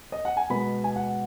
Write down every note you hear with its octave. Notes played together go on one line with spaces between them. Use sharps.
D#5
F#5
G#5
B2 G#3 B3 B5
G#5
F#5